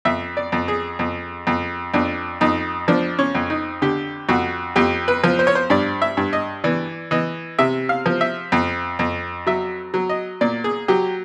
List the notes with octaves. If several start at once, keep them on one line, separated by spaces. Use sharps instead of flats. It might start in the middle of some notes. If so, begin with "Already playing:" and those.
F2 E5
D5
F2
G#4
F2
F2
F2 D4
F2 D#4
F3 D4
C#4
F2
D#4
D3 G4
F2 F#4
F2 G4
B4
F3
C5
C#5
C5
G2 D5
E5
G2
D#5
E3 D5
E3 D#5
C3 E5
F5
F3
E5
F2
F2
F#3 E5
F#3
D#5
A#2 D5
G#4
F#3 G4